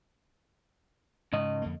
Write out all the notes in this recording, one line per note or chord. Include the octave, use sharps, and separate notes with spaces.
G#2 C#3 D#5
F2 D3 A#3